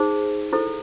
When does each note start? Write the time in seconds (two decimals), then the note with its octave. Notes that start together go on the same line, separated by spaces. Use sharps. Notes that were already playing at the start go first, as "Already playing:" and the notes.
Already playing: D#4 G#4 C5
0.53 E4 A4 C5